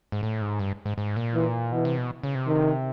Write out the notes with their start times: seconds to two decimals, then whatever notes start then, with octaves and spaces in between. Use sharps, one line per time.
0.12 G#2
0.23 A2
0.42 G#2
0.59 G2
0.86 G#2
0.98 G#2
1.16 A#2
1.34 E3
1.72 B2 E3
1.85 C3
1.98 B2
2.23 C#3
2.35 C3
2.48 D#3